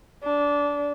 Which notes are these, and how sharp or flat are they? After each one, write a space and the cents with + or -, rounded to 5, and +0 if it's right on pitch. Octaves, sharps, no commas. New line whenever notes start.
D4 -20